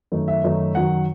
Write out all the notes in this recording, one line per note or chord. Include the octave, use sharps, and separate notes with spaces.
F#2 D#3 A3 D#4
E5
F#2 D#3 A3 D#4
F#2 D#3 F#3 F#5